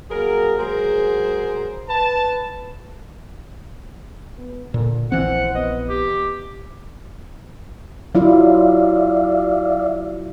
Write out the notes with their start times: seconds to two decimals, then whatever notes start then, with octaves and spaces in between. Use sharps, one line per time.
0.11 F#3 A#3 G#4 A#4
0.59 F#3 G#3 G#4 A#4 C5
1.89 B4 A5
4.38 B3
4.74 A#2 D3
5.12 A#1 E3 C4 C5 F#5
5.55 B3 D#5
5.89 G4
8.15 F#3 E4 F4 D5 E5 F5